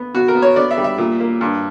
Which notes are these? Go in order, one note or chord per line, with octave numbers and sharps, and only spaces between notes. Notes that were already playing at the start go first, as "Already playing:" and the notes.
Already playing: B3
B2 F#4
A#4
B3
C#5
B3 D5
E5
G3
E5
A#2
A#3
G2